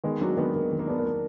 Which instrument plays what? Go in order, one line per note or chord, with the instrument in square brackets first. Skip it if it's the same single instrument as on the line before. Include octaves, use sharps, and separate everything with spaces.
[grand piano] D#3 [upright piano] G#3 B3
[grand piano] F#3 [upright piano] A#3 D4
[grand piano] D#3 [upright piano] G#3 B3
[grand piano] D#3 [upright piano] A#3
[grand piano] D#3
[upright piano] A#3
[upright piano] B3 [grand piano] D4
[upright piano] A#3
[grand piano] D4